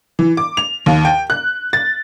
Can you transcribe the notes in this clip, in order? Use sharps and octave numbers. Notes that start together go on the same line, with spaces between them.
E3
D6
F7
D#2
G5
F#6
A6